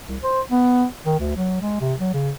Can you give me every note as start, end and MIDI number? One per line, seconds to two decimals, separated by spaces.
0.08 0.17 36
0.23 0.41 72
0.51 0.85 59
1.06 1.16 51
1.19 1.35 38
1.37 1.60 54
1.61 1.79 56
1.81 1.94 48
1.99 2.13 54
2.14 2.30 49